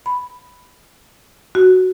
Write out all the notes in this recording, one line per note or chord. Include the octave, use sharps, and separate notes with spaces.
B5
F#4